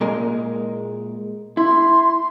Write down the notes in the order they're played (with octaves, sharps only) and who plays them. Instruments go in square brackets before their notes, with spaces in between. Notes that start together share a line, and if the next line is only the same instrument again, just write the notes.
[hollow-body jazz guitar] A#2 G#3 A#4
[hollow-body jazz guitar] E4 [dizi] C6